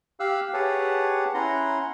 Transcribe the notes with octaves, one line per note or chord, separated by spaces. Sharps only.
G4 F5 E6 F#6
G4 G#4 B4 C#5 F#5 A5
C#4 E4 F#5 A#5 C6